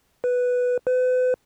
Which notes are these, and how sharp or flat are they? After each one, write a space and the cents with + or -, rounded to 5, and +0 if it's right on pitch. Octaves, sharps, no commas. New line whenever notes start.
B4 +0
B4 +40